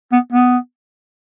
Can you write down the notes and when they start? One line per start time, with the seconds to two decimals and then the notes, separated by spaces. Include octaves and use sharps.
0.12 B3
0.32 B3